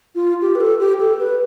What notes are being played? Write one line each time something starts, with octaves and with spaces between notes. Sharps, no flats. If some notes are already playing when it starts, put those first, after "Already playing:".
F4
G4
B4
A4
G4
A4
B4